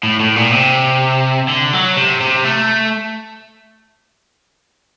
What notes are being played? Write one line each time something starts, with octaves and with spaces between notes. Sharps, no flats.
A2
A2
A#2
C3
D3
F#3
C3
C3
A3